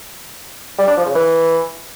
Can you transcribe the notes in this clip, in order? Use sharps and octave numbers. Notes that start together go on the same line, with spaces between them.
G3
D4
F3
C#3
E3